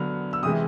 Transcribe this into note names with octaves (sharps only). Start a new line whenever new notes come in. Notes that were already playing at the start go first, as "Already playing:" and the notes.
Already playing: D3 F#3 B3 F6
E6
C3 E3 G#3 D#6